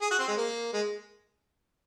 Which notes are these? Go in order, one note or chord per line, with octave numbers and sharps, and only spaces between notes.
G#4
F#4
C4
G#3
A#3
G#3